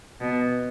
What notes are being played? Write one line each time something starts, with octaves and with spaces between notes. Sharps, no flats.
B2